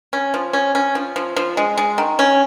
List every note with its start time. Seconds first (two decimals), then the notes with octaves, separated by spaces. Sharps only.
0.13 C#4
0.34 F3
0.53 C#4
0.75 C#4
0.95 F3
1.16 F3
1.36 F3
1.57 G#3
1.78 G#3
1.98 D#3
2.19 C#4